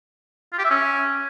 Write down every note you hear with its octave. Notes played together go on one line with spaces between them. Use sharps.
F4
G4
E5
C#4